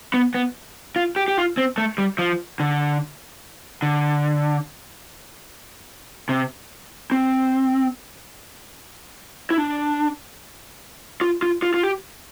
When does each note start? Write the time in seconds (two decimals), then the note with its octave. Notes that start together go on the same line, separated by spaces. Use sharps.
0.14 B3
0.35 B3
0.96 F4
1.16 G4
1.28 G4
1.37 F4
1.57 C4
1.78 A3
1.98 G3
2.18 F3
2.60 D3
3.82 D3
6.29 C3
7.12 C4
9.51 E4
9.58 D4
11.21 F4
11.42 F4
11.62 F4
11.74 F4
11.83 G4